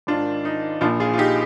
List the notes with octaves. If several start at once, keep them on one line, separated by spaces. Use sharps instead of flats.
G#1 G#2 D#3 D4 F4
D#4
A#1 A#2 F3 D4 F4
F4 G#4
F4
D#4 G4